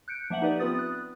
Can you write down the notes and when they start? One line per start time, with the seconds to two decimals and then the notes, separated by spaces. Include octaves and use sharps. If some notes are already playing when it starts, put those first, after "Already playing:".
0.08 F#6 G6 C#7 D7
0.30 F3 A#3 E5 F#5 F#7
0.42 D#4 G4 B4 D5
0.59 B3 C4 F4 B4 D#6 A6
0.79 F#6